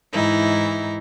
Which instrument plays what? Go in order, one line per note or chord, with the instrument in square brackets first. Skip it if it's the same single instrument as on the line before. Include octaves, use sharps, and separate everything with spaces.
[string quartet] G#2 E3 D#4 E4